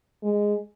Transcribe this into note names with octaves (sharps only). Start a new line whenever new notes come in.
G#3